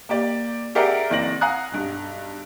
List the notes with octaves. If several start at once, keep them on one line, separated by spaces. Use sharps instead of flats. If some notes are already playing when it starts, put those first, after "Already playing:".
A#3 G4 D5
G4 G#4 A#4 D5 E5 F#5
F#1 E3 C4 D5 A#6 F#7
F5 F#5 G#5 A#5 D#6 F#6
B1 G2